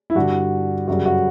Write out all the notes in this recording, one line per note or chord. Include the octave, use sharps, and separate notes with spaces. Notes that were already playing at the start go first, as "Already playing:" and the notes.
E4
G2 D3 G3 F#4
F#2 C#3 G3 F#4
F#4